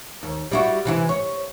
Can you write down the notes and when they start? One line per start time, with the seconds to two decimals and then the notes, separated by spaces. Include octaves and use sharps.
0.23 D#2
0.51 G3 E4 F#4
0.85 C3 E3 E4
1.09 C#5